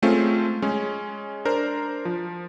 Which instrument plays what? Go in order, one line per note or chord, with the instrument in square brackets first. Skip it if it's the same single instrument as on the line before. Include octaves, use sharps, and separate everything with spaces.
[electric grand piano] G#3 A3 C4 C#4 F4 C5
G#3 C#4
D4 A#4 C5
F3